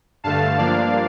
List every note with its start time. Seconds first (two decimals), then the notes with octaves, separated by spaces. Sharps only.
0.24 G2 D3 A3 F5 A5
0.58 G2 F3 A#3 D4 D5 F5